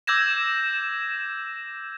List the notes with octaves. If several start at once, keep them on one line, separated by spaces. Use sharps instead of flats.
D6 E6 G6 G#6 A#6 E7